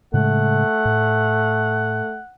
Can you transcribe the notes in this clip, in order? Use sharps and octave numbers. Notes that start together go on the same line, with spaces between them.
A2 C#3 G#3 A3 F#5
A2